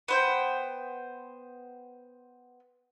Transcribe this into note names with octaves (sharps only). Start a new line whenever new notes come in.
B3 C5 G5